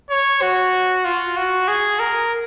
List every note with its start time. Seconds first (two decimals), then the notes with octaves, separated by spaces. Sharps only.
0.11 C#5
0.42 F#4
1.05 F4
1.37 F#4
1.68 G#4
2.00 A#4